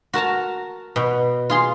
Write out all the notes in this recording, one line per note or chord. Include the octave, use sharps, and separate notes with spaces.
F#4 A#4 A5 A#5
B2
F4 G#4 C6